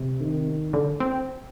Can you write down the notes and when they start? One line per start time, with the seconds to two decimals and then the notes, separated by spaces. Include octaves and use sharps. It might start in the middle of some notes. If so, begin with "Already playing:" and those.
Already playing: C3
0.21 D#3
0.73 D3
1.00 C4